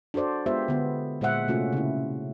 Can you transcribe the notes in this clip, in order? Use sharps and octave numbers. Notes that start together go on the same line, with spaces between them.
D4 F#4 A4 C5 D5
G#3 B3 F4 G4 C5 E5
D3 B3
A#2 G#3 C5 E5 F#5
C3 A3 C#4 F4 F#4
C#3 E4